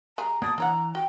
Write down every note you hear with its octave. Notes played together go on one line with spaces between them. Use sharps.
G3 G#4 A#5
F#3 A#3 D5 A5 D#6
E3 D4 C#5 F#5 A#5
F#4 G5